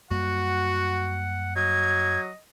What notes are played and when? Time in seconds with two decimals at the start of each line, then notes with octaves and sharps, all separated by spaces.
0.11 F#2 G3 A#3 F#4 F#5
1.56 F#3 D#5 G#6